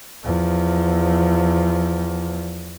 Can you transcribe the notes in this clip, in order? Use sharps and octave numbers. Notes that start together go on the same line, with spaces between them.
E2 F3